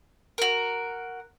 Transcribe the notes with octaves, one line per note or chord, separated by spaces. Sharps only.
F#4 A#4